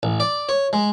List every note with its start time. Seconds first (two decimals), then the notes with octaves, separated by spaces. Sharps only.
0.03 A1
0.20 D5
0.49 C#5
0.73 G#3